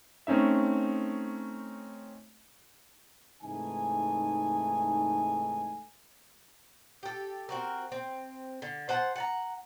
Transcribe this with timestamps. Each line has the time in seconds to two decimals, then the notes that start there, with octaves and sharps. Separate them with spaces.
0.27 A3 C4 C#4 D#4 E5
3.42 G#2 C3 E3 A3 D#4 G#5
7.03 G4 A4
7.49 C4 F#4 A#4
7.92 C4
8.62 D3
8.89 C5 F#5 A5
9.16 F#5 A5 A#5